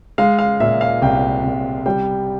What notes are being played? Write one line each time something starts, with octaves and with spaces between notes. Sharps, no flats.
G#3 F5
F5
A#2 E5
F5
C2 G5
C2
G3 G5